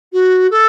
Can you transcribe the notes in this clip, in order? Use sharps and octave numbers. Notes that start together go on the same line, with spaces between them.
F#4
A4